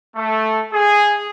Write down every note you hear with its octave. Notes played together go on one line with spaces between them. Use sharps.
A3
G#4